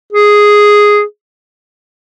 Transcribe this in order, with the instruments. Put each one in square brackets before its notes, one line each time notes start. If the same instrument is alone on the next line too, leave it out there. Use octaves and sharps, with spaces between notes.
[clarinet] G#4